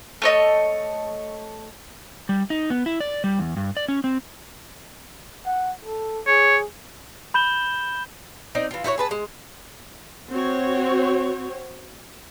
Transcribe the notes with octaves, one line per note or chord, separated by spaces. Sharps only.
A3 C#5 D#5
G3
D#4
B3
E4
D5
G3
E2
G2
D5
C#4
C4
F#5
A4
G#4 C#5
B5 G6 E7 G7
C4 D#4 D5
E3 F4
E4 F#4 C5 C#5
G#4 B4 A5
G#3
C4 F#4 C#5